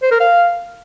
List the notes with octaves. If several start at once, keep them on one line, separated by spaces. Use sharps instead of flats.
C5
A#4
F5